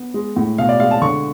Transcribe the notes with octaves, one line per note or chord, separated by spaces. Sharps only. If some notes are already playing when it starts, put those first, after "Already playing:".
Already playing: B3
G#3
A2
B2 F5
D5
G#3 F5
A5
D3 C#6